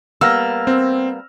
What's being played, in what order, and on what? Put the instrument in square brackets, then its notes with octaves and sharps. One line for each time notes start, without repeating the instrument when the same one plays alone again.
[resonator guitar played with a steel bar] G3 A#3 B3 [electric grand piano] E6 F6 A#6
[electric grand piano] C4